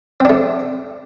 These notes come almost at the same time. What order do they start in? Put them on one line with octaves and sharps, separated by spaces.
C4 D4 A3